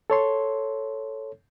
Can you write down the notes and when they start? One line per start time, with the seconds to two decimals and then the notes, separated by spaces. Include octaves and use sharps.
0.10 A4 C#5 C6